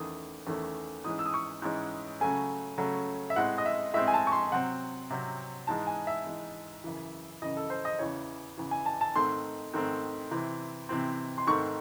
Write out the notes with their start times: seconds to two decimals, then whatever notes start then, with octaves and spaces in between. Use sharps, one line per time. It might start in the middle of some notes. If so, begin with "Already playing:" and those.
Already playing: E2 D#3 A3 C#4 D#6
0.47 E2 D#3 A3 C#4
1.04 G#2 E3 G#3 C#4 D#6
1.19 E6
1.26 D#6
1.34 C#6
1.62 G#2 E3 G#3 C#4
2.20 C#3 F#3 A3 C#4 G#5
2.78 C#3 F#3 A3 C#4
3.30 E5
3.36 A2 G#3 C4 F#5
3.58 D#5
3.66 E5
3.94 A2 G#3 C4 E5
4.08 G#5
4.14 A5
4.27 C#6
4.32 C6
4.52 C3 F#3 C4 F#5
5.10 C3 F#3 C4
5.67 G#2 E3 G#3 A5
5.87 G#5
6.07 E5
6.26 G#2 E3 G#3
6.84 F#2 C#3 E3
7.42 F#2 C#3 E3 D#5
7.57 A4
7.70 C5
7.85 D#5
7.99 E2 C#3 E3 C#5
8.57 E2 C#3 E3
8.71 G#5
8.86 A5
9.01 A5
9.15 G#2 D#3 A3 C4 C6
9.74 G#2 D#3 A3 C4
10.31 C3 E3 C4
10.89 C3 E3 C4
11.38 C6
11.47 G#2 D#3 A3 C4 C#6